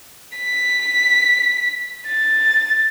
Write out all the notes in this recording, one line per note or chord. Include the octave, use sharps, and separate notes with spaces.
B6
A6